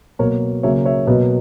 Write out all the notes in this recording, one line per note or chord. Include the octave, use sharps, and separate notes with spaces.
B2 F#3 A#3 A#4 C#5
C#3 F#3 A#3 C#5 E5
C#5 E5
B2 F#3 A#3 B4 D#5